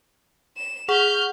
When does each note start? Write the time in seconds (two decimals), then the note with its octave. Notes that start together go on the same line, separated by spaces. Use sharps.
0.57 E7
0.89 G#4 F#5 C#6 F6 G6